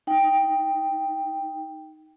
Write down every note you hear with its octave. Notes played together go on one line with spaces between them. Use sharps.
D#4 G5